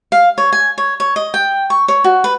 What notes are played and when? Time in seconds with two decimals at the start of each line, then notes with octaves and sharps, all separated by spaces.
0.12 F5
0.38 C#5
0.52 G#5
0.78 C#5
1.00 C#5
1.16 D#5
1.34 G5
1.70 C#6
1.88 C#5
2.04 F#4
2.24 B4